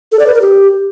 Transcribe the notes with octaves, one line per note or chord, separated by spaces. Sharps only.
A4
D5
B4
A#4
G4